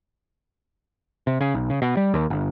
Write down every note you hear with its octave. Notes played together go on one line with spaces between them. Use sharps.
C3
C#3
B1
C#3
B2
G3
D#2
G1